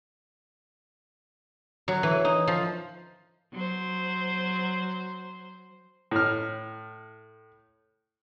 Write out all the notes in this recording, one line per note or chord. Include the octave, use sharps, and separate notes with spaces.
F#3
E3
D#4
F3
F#3 C5
A2 F6